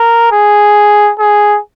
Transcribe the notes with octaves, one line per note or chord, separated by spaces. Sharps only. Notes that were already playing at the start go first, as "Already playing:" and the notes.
Already playing: A#4
G#4
G#4